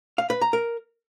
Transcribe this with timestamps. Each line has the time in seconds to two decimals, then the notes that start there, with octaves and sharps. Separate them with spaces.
0.18 F5
0.30 B4
0.41 A#5
0.53 A#4